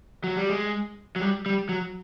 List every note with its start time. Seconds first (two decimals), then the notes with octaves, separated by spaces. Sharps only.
0.24 F#3
0.37 G3
0.49 G#3
1.16 F#3
1.21 G3
1.46 G3
1.69 F#3